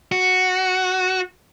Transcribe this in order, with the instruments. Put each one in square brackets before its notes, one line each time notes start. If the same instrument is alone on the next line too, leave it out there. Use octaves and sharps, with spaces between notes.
[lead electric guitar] F#4